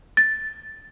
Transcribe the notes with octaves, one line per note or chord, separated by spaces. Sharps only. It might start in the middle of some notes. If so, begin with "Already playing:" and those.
A6